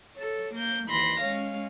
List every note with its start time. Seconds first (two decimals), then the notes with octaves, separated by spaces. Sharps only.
0.15 A4 C#5
0.54 A#3 G6
0.87 D#2 E3 B5 C6 A#6
1.20 G#3 C#4 C#5 F5